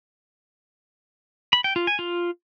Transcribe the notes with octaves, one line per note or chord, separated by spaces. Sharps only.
B5
G5
F4
G#5
F4